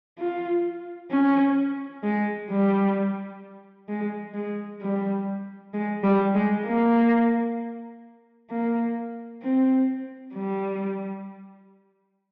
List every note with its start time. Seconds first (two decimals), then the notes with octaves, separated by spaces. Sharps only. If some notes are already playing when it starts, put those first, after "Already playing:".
0.19 F4
1.11 C#4
2.03 G#3
2.51 G3
3.88 G#3
4.34 G#3
4.81 G3
5.74 G#3
6.03 G3
6.35 G#3
6.66 A#3
8.50 A#3
9.42 C4
10.34 G3